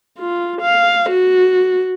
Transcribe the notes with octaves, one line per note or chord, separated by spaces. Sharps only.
F4
F5
F#4